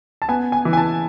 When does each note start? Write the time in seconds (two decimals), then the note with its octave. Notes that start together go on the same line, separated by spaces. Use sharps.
0.22 A5
0.28 B3 G#5
0.52 G#5
0.65 E3
0.73 G#5
0.77 A5